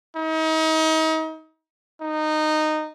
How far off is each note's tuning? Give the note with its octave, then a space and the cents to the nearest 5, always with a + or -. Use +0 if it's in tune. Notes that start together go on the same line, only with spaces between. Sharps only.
D#4 +35
D#4 -15